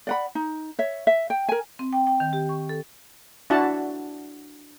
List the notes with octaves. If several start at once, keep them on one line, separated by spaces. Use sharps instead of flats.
D5 F#5 B5
D#4
C#5 E5
E5
G5
A#4 G#5
C4
G5
G5
D#3
G4
C#6
A4
D4 E4 F#4 F#5 A5